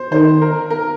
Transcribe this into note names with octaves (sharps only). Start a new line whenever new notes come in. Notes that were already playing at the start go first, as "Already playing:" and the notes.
Already playing: C5
D#3 C5
A#4
A#4